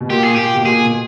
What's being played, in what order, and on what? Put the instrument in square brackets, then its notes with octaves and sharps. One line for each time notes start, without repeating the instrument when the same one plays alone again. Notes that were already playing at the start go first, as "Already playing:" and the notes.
[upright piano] B2
[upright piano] A#2 [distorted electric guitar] G4
[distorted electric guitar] G#4
[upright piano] A#2 [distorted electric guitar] G4
[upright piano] B2
[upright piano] A#2 [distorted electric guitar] G#4
[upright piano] B2